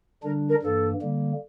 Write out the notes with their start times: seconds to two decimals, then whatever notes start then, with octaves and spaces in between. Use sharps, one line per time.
0.23 D3 G3 D4 A#4
0.48 A#4
0.62 G2 E3 A#3 A4
1.01 D3 G3 A#3